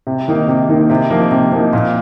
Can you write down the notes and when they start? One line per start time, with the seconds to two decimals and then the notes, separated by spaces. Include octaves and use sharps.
0.07 C3
0.28 D#3 A#3 D#4
0.48 C3
0.69 D#3 A#3 D#4
0.90 C3
1.10 F3 A#3 D#4
1.31 C3
1.52 F3 A#3 D#4
1.73 A#2